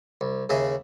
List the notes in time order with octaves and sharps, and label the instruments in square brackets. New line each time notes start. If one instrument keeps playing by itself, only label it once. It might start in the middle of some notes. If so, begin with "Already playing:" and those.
[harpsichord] C2
D#2 C#3 G#4 D#5 E5